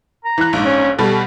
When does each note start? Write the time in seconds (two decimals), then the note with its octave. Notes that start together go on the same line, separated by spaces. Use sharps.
0.25 A#5
0.38 E3 F#6
0.53 A#1 G#2
0.65 C#4
0.99 B2 G3 A4